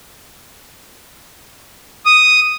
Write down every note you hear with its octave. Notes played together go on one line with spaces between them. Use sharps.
D#6